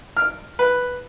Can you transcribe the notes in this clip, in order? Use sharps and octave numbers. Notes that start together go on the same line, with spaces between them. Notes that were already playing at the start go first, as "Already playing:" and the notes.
F6
B4